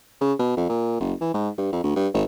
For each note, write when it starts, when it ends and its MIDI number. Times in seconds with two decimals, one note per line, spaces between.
0.21 0.34 49
0.39 0.54 47
0.57 0.66 41
0.69 0.96 46
1.00 1.13 30
1.21 1.30 52
1.34 1.49 44
1.58 1.67 43
1.73 1.81 41
1.84 1.93 38
1.96 2.08 43
2.14 2.23 32